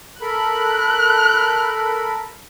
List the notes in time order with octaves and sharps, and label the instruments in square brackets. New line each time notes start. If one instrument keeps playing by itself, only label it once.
[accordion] A4 A#4 B5 [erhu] F#6